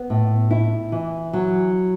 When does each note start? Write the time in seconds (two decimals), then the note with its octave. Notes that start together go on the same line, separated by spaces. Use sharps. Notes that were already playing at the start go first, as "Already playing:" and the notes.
Already playing: B3
0.10 A2
0.51 E4
0.92 E3
1.33 F#3